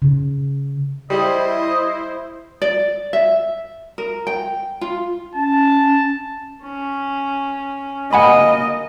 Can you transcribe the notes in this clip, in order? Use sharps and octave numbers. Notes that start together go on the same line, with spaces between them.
C#3
G3 E4 C5 D#5
D5
E5
A#4
G5
F4
C#4 A5
C#4
A#3 D#5 F#5 G#5 B5